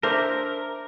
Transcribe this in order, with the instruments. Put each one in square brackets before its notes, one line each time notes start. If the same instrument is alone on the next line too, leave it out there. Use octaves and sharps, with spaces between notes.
[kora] D4 C5 E5 [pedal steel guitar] A#4